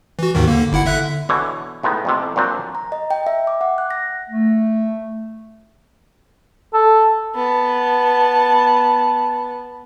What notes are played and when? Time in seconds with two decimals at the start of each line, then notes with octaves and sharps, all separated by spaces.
0.19 E3 F#4
0.35 D#2 G#2 D#3
0.47 D3 A#3
0.72 G1 E4 F#5
0.86 D3 E5 F#6
1.29 B2 D3 E3 C#5
1.83 A2 G#3 B3 D#4
2.05 F2 A2 C3
2.36 A#2 F#3 C4 D4
2.75 A#5
2.92 D#5
3.11 G5
3.27 E5
3.47 D6
3.61 F#5
3.78 F#6
3.91 A#6
4.29 A3
6.74 A4
7.35 B3 A5